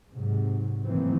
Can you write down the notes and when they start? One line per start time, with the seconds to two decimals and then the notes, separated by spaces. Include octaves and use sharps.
0.13 G#2 C3 F#3
0.85 F#2 A2 D#3 E3 A#3 C4